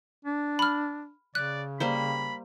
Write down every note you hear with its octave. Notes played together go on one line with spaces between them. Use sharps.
D4
B5 F6
C#3 D5 F#6
G3 A#3 C5 B5